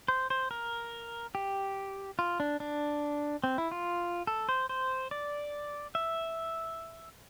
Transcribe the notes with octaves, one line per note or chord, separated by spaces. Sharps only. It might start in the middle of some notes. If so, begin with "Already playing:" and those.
C5
C5
A#4
G4
F4
D4
D4
C4
E4
F4
A4
C5
C5
D5
E5